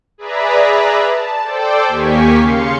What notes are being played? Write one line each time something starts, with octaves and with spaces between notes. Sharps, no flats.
G#4 B4 D5 E5 A#5 B5
A5
A4 C5 D5 G5 D6 E6
D#2 A#3 G4 G#5 C#6 B6
C#3 F5 C6 C#7